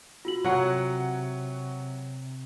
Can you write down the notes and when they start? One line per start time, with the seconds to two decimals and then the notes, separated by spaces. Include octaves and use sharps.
0.25 F4 F#4 F#7
0.44 C3 F#3 C#5 F#5